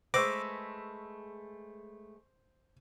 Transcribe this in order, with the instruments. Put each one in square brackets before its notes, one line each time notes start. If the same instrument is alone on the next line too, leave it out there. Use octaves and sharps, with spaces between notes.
[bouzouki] G#3 A3 B4 [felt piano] C5 [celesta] C#6 E6 A#6 [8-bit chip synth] D6